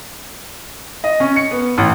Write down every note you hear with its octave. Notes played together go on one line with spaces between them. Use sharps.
D#5
C#4
C#7
B3
A1